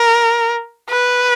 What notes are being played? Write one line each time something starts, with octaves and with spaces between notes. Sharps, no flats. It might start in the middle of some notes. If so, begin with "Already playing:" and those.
Already playing: A#4
B4